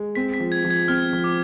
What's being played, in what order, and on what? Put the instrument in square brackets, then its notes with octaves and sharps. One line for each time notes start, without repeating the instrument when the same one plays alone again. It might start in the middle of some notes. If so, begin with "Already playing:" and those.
Already playing: [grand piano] G#3
[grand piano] C4 [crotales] B6
[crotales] B6
[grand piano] F3
[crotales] G#6
[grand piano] F3
[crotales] G#6
[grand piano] C4 [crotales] F6
[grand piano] F3
[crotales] D6